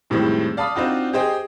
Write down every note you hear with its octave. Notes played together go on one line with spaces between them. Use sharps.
F2 A2 D#3 G3 G#3 C4
D5 F5 A5 B5 D#6
C4 D4 D#4 F4 F#4
G4 G#4 C5 D#5 G5